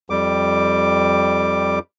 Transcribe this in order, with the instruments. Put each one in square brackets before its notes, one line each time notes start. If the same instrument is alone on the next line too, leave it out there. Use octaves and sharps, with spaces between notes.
[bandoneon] F2 G3 D6